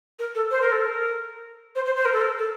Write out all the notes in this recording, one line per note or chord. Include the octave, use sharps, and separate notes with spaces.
A#4
A4
C5
A#4
A4
A#4
C5
C5
C5
A#4
A4
A#4
A4